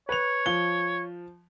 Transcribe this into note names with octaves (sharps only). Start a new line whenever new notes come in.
B4 C#5 F7
F3 G7